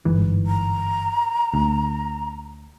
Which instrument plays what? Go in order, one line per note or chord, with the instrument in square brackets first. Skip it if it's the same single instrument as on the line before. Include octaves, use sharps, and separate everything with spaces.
[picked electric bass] G1 G#2 E3
[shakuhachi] A#5
[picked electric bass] D2